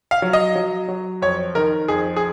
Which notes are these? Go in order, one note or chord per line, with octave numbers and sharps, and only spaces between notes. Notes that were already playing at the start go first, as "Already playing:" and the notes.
F5
F#3
D#5
F#3
F#3
F2 C#5
D#3 A#4
F2 G#4
G#4